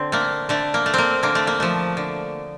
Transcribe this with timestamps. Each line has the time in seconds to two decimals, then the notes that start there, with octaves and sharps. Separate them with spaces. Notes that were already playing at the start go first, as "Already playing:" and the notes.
Already playing: D3 C4
0.12 A3 A#3
0.49 D3 A3
0.74 A#3
0.86 A3
0.94 A#3 C4
1.23 D3 A#3
1.35 A3
1.47 A#3
1.60 F3 A3
1.97 D3